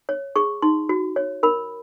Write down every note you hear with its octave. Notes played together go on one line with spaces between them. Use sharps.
C#5
G#4 C#6
D#4 C6
F#4
C#5
A#4 B5